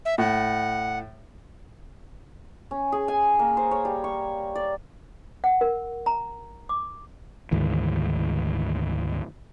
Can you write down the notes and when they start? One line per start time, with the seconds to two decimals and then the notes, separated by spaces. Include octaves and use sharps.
0.05 E5
0.18 A2 F#5
2.71 C#4
2.92 G#4
3.08 G#5
3.39 A#3
3.57 C5
3.71 C#5
3.85 G3
4.04 C#6
4.55 D5
5.44 F#5
5.61 A#4
6.06 A#5
6.69 D6
7.51 D2 G#2 D#3 E3